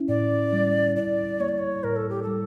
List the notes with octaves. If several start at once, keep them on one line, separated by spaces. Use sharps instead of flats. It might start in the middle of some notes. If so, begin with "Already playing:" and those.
Already playing: C#4 E4
A2 D5
G3
E4 D5
A#3 C#5
D5
C#5
A2 A#4
A4
G4
G3 A4